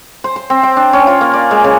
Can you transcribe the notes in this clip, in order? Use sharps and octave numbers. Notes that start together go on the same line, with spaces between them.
C5
C5
C4
G5
D4
C#4
F4
A#3
D5
G#3
C#3